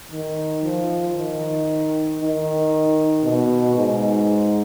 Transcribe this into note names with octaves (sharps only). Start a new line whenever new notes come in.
D#3
F3
D#3
D#3
B2
G#2